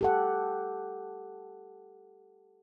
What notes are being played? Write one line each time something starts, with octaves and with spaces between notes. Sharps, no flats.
G4 A4 F#5